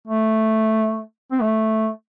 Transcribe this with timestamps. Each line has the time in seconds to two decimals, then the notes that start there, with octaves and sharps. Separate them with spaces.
0.08 A3
1.32 C4
1.41 A3